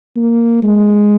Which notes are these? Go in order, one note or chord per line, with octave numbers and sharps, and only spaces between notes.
A#3
G#3